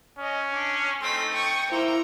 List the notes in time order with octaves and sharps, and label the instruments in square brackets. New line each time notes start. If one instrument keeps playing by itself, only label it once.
[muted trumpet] C#4 [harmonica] D#5
[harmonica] D4
[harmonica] A3 D#4 [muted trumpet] C4 [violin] C6 B6
[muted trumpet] G5 [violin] C#6 D#6
[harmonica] A#3 C6 E6 [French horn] E4 [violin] C5 A#5